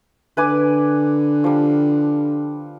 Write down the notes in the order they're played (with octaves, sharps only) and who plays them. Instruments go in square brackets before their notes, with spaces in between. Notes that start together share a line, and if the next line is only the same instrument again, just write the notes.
[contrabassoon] D3 [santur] B4 G#5 D6
[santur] F3 G3